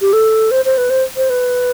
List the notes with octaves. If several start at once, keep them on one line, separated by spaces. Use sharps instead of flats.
G4
A4
C5
C5
B4
C5
C5
B4